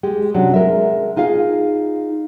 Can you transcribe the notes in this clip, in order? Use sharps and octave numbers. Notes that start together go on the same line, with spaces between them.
G#3 G4
C3 F#3 C#4 D4
G#3 A#4 E5
D#4 F4 G#4 F5